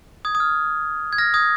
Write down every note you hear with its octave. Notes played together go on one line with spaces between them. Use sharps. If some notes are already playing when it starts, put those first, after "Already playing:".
D#6 G#6
D#6
F6
G#6
F6 A#6
D#6 G#6